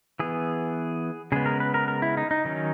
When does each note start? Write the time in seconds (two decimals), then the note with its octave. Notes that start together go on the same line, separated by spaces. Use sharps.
0.19 E3 B3 G#4
1.32 C#3 G#3 B3 G#4
1.46 A#4
1.60 B4
1.74 A#4
1.88 A#4
2.02 E4
2.17 D#4
2.31 D#4
2.45 D#3 F#3 C#4